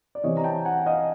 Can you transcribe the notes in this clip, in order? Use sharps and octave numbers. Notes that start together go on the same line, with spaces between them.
D5
C3 E3 C#5 D#5
A#5
G5 A5
F#5 G#5
D#5 F5